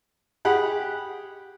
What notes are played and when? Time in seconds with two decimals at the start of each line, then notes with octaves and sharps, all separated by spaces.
0.45 G4 G#4 F#5 B5